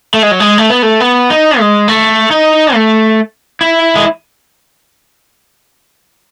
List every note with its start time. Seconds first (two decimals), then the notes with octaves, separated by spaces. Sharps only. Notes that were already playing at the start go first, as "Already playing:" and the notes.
0.14 A3
0.22 G#3
0.31 F#3
0.40 G#3
0.58 A3
0.70 B3
0.82 A3
1.00 B3
1.30 D#4
1.59 G#3
1.88 A3
2.31 D#4
2.74 A3
3.61 E4
3.96 G#3